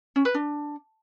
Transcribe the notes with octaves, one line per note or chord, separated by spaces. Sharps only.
C#4
B4
D4